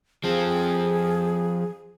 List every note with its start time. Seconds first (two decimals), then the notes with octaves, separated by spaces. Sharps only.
0.24 F3 C4 G#4